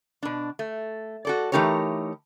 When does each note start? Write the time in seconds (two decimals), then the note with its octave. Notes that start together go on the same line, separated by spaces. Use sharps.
0.23 B2 D4
0.59 A3
1.25 F#4 A4 D5
1.52 E3 A3 D#4 G4 A#4 C#5